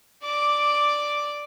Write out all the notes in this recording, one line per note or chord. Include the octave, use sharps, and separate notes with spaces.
D5 D6